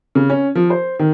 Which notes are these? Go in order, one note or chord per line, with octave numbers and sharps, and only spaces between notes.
C#3
C#4
F3
C5
D#3